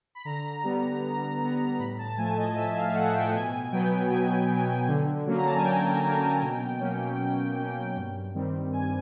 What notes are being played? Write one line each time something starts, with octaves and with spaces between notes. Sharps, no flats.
B5
D3 A#5
G3 B3
D3
G3 B3
A2 B5
A5
F3 A3 G#5
D#5
A2 E5
F5
F3 A3 F#5
G5
B2 G#5
F#3 B3 G5
B2 G#5
F#3 B3
D3
F#3 A#3 C#4
A#5
A5
G#5
D3 G5
F#3 A#3 C#4
B2
F#3 A#3 C#4
B2
F#3 A#3 C#4
G2
D#3 G3 C4
G2 G#5